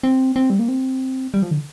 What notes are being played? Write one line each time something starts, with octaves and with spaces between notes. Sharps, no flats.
C4
C4
G3
A#3
C4
G3
F3
D3